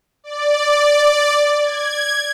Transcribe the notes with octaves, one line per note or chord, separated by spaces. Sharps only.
D5
G#6